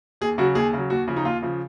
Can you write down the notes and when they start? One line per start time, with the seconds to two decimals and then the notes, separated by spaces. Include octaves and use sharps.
0.21 D#2 G#4
0.38 C#3 F#3 F#4
0.55 D#2 G#4
0.73 C#3 F#3
0.90 D#2 F#4
1.08 C#3 F3
1.16 D#4
1.24 D#2 F4
1.42 C#3 F3